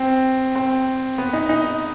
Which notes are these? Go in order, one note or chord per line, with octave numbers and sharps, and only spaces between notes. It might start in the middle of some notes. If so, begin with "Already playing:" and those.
Already playing: C4
C4
B3
D#4
D#4